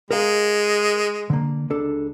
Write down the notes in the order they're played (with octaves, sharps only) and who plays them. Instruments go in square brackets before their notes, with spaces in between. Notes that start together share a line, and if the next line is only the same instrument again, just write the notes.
[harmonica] G#3 [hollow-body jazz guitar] A#4 F5
[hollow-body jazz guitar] D3 A#3
C#2 D4 A4